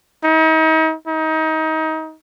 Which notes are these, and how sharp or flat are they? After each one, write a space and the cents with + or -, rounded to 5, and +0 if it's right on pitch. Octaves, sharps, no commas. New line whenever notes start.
D#4 +40
D#4 +25